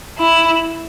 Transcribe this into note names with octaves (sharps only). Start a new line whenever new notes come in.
E4